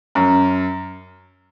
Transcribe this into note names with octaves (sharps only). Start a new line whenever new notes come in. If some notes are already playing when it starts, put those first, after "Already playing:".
F#2